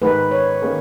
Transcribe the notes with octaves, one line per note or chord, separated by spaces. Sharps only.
G#2 D#3 G#3 D#4 G#4 B4
C#5
D#3 A#3 C#4 G#4